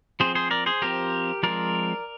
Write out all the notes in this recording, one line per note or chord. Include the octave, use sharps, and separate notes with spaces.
F3 C4 G#4 C5
G#4 C5
A#4 D5
G#4 C5
F3 C4 G4 A#4
F3 G#3 C4 A#4 D5